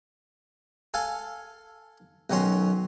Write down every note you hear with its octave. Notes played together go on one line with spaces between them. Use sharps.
A4 F5 G#5
B1 D#3 F#3 C#4 C6